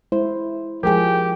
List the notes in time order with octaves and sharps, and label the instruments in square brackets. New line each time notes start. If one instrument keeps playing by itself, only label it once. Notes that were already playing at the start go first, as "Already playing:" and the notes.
[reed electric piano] G#3 C5 [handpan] E4
[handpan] F3 G#3 G#4 [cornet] G4 [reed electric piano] A#4 G5